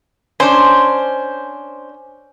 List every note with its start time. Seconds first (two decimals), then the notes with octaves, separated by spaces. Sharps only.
0.40 C#4 D4 C5